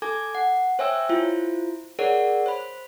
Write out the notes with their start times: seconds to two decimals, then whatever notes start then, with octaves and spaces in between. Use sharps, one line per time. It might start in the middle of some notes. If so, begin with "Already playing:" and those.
0.02 A4 G#5 D6 G#6
0.35 F#5
0.79 C5 C#5 E5 G5 G#5 E6
1.09 E4 F4 C5
1.99 G#4 A#4 C#5 D5 F#5
2.46 C5 B5